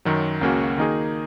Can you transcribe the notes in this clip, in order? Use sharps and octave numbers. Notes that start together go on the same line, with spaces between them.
F#2 D#3 F#3
C#2 C#3 A#3 C#4 F#4
D#3 A#3 D#4 G#4